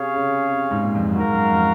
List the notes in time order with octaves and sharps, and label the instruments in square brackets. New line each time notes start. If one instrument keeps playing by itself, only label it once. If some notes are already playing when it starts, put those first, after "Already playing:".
Already playing: [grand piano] C3 [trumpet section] C#4 G#4 C#5 F5
[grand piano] C#3
C3
G#2
A#2
F2
F#2
[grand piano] G#2 [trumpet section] F#4 A#4 F5
[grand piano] F#2
F2